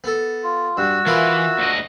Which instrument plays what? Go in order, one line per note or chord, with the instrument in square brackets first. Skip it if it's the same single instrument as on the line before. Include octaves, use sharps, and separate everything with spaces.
[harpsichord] B3 A4
[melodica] F4
[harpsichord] G2 [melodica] F#4 E6
[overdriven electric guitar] E3 [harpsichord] E4 F4 A#4
[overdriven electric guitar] D2 D#5